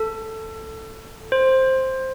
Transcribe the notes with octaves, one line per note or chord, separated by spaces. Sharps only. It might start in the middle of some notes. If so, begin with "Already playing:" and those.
Already playing: A4
C5